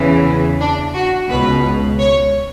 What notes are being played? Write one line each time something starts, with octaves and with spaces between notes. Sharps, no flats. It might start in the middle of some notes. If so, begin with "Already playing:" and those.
Already playing: E2 C#3 E3
D4
F#4
C#2 B2 B4
C#5